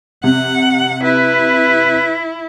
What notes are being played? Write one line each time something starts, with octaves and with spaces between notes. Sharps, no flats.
C3 F#5
E4 B4